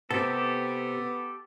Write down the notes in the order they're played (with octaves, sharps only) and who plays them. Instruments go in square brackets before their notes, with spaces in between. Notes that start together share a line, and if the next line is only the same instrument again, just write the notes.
[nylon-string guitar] C3 [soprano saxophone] B3 [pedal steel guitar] G4 A4